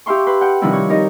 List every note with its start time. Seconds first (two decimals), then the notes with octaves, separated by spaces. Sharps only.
0.06 G4 E5 F5 C6 C#6
0.27 B4 C6
0.41 F#5 G5
0.62 C3 D#3 F3 G3 D4 E4
0.73 C#5
0.89 D#4 G4 A#4 D#5